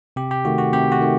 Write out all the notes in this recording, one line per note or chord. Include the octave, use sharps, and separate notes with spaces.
C3 G4
G4
D#3 A3 F#4
F#4
C3 G4
F#4
D#3 A3